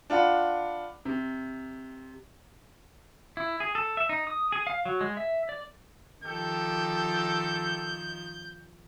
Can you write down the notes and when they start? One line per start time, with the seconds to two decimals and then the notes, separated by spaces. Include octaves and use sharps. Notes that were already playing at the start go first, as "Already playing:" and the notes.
0.10 D4 F4 F#5 B5
1.05 C3
3.37 E4
3.60 G#4
3.75 A4
3.97 E5
4.09 D#4
4.27 D#6
4.52 G#4
4.67 F5
4.85 F#3
5.01 G#3
5.17 E5
5.49 D5
6.24 D#3 F3 G4 A4 G6